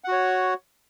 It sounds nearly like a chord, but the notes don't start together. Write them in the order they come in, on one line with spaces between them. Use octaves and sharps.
F#5 F#4 C#5